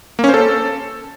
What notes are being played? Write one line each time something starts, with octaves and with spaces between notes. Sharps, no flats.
A#3
C#4
C5
A4